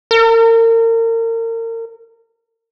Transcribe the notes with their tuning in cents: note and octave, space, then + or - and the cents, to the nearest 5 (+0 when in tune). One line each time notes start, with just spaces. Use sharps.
A#4 -35